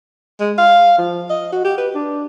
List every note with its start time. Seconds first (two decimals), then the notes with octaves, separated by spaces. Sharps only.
0.40 G#3
0.58 F5
0.98 F3
1.30 D#5
1.52 F#4
1.65 G4
1.78 B4
1.95 D4